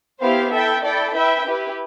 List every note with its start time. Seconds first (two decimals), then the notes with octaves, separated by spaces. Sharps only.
0.21 B3 E4 G4 C5 F5
0.51 E4 A4 E5 G5
0.83 E4 A4 D5 G5
1.14 E4 B4 E5 G5
1.45 E4 G4 B4